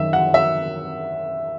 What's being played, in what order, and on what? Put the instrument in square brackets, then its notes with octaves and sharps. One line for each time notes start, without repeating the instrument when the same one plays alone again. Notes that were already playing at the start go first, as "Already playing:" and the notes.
Already playing: [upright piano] F#2 D#3 E5
F#5
E5